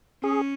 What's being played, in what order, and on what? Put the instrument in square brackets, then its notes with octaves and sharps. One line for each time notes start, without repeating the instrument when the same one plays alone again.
[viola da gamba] C#4 [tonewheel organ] G#4